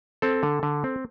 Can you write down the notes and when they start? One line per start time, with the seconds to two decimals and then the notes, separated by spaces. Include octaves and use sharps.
0.22 C4 A4
0.43 D3
0.63 D3
0.84 C4